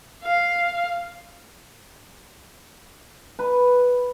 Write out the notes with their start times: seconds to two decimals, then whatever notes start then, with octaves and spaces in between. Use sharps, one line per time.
0.23 F5
3.39 B4